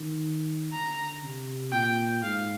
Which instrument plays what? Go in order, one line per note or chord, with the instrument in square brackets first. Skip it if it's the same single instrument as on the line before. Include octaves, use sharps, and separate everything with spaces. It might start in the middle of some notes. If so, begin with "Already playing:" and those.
Already playing: [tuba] D#3
[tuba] D3 [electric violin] A#5
[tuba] C3
[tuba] A#2 [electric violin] G5
[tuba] G#2 [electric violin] F5